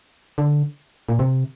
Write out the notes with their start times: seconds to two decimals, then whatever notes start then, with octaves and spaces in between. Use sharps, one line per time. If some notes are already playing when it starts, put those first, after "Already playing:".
0.38 D3
1.09 A#2
1.19 C3